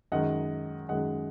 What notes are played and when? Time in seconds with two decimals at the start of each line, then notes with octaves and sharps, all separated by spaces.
0.12 F#2 D#3 G#3 D#5 F#5
0.89 F#2 D#3 G#3 D#5 F#5